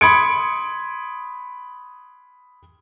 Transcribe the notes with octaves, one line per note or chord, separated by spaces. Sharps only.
B5 C6 D#6 G#6 C#7 D7